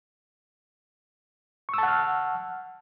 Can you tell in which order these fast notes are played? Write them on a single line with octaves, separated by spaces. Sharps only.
C#6 E6 A5 F#5 F6